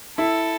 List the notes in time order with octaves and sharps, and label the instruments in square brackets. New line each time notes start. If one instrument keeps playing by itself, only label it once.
[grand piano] E4 [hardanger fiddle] A4